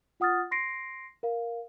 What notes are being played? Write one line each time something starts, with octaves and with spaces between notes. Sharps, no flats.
F4 F#5 D#6 F6 A6
C6 A#6 C7 D7
A#4 F5